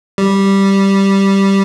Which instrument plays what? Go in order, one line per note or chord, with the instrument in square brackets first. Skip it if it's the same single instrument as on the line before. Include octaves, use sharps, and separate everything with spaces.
[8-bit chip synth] G3